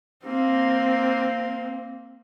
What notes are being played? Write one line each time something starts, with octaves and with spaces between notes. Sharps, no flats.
A#3 C4